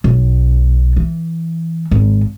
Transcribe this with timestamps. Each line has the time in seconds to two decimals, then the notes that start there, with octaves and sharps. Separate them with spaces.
0.04 B1
0.96 E3
1.91 G#1